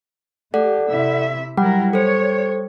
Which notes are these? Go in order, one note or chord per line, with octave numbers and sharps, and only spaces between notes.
A3 G4 A4 D5 F#5
C3 E4 E5
F#3 G3 E4 A#4 F#5
A4 C5 C#5